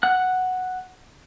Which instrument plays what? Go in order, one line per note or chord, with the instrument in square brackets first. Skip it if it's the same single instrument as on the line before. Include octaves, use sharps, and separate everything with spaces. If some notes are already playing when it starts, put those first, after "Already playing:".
[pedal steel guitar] F#5 F#6